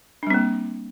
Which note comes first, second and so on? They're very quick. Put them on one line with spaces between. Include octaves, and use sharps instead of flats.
D4 G3 C4 A#3